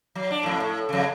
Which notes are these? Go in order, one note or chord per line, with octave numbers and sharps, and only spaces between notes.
F#3
D4
F2 A2
A2
F2 C#3